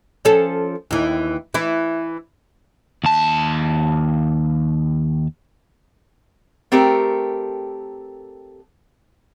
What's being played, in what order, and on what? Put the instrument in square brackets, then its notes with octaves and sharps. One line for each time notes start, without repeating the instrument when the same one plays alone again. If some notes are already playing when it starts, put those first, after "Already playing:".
[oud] F3 C#4 A4
D#2 E3
E3 E4
[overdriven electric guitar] D#2 A5
[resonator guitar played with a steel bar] A3 C4 G4 A4 A#4